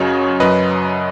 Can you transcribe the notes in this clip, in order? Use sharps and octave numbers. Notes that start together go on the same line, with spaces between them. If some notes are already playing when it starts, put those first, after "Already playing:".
Already playing: F#2 C#3 F#3 C#5 D#5
F#2 F#3 B4 D#5